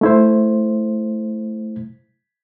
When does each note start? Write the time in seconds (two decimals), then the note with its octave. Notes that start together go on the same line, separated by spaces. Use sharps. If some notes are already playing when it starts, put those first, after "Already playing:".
0.01 A3 E4 C5